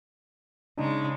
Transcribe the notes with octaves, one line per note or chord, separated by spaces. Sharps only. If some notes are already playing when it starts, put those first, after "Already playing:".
C#3 G#3 D4 D#4